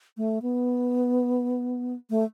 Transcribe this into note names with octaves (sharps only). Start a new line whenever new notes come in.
A3
B3
A3